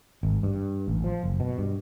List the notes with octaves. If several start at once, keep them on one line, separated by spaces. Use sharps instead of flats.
G#1
G2
A1
F3
F#1
B2
G2